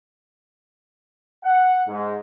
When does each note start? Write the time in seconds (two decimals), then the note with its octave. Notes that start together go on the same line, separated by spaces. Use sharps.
1.44 F#5
1.87 G#2